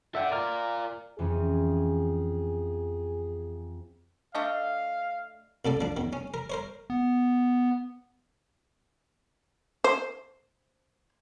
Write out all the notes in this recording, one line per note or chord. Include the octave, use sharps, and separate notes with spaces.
A4 D5 E5 F#5 G5
F4 A#4 D5 F6
F2 E3 C#4 G#4
A3 D4 D#5 F5
C2 A2 A4 D5
F3 D4
E2 D#3
C#4
A#4
A#4 C5 C#5
B3
C5